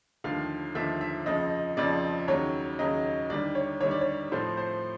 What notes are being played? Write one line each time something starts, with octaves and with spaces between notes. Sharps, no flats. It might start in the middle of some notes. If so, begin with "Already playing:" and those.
D#2 D3 F3 A3 F5
D#2 D3 F3 A3 E5
E5
F2 C#3 F3 D#5
F2 C#3 F3 D5
D#2 C#3 F#3 C#5
D#2 C#3 F#3 D#5
D#2 D3 G3 D5
C#5
D#2 D3 G3 C#5
D5
C#5
A2 F3 A3 C4 C5
C5